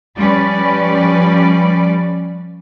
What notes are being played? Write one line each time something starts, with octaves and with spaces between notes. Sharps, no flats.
F3 G3 C#4 B4 D5